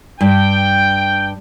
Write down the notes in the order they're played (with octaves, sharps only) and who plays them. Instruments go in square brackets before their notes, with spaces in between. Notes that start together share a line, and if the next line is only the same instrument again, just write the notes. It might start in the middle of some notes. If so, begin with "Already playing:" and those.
[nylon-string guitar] G2 [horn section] G5